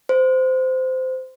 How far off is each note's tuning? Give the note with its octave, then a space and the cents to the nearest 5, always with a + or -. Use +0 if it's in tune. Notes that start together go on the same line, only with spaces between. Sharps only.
C5 -20